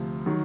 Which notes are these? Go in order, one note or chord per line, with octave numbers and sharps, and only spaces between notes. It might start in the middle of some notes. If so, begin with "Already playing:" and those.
Already playing: D2 C3 F3
D#3 F#3